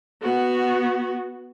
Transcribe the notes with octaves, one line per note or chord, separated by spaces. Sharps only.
B3 F#4